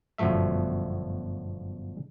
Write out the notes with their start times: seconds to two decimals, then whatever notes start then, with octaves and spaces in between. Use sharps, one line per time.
0.18 G1 F#2 B2 F3 A3 E5